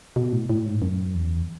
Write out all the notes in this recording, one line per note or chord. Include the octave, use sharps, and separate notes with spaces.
B2
A2
A2
G#2
F#2
E2